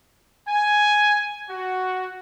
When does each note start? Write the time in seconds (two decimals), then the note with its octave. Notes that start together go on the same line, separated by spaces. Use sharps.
0.47 G#5
1.50 F#4